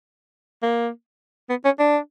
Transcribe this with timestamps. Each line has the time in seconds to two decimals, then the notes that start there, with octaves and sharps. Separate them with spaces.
0.63 A#3
1.50 B3
1.65 C#4
1.79 D4